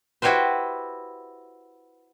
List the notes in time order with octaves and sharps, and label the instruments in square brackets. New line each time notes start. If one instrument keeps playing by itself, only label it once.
[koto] E4 F#4 G4 B4 C5